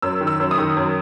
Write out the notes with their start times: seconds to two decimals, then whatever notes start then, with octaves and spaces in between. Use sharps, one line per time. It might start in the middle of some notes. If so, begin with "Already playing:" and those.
0.02 F#2 E6
0.21 D#3
0.27 E6
0.40 F#2
0.51 D#6
0.58 D#3
0.77 F#2